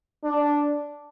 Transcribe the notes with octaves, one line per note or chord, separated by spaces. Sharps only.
D4